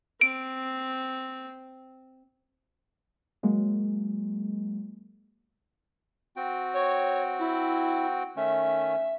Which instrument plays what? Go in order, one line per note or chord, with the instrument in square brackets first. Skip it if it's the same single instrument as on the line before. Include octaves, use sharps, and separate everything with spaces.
[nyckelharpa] C4 [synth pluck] D7
[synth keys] F#3 G#3 A#3
[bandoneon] C4 F#4 G5
[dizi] C#5
E4
[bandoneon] D#3 A3 C#4 [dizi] E5